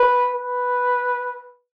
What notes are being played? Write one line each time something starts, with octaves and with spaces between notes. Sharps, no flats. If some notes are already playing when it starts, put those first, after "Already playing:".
Already playing: B4
B4